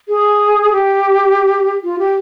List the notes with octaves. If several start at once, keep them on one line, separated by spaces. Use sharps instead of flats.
G#4
G4
F4
G4